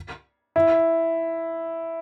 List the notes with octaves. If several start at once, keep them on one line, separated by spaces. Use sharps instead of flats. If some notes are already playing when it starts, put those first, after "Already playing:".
E4